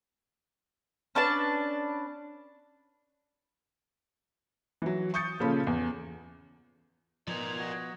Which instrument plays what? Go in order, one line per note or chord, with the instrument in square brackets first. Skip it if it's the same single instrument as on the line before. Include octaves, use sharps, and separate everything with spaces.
[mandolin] C#4 D4 B4 A5
[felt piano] E3 F#3
C#6 D#6 G6 A6 C#7
A#2 C#3 F3 C#4 A4 B5
E2
[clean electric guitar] F3 B3 [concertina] D#4 [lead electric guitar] A#4 D5 [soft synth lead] G#6
[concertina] F#4 D#5